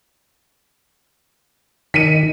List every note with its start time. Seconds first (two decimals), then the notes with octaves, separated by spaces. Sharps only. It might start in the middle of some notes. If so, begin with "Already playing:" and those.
1.94 D#3 B6 C#7 D#7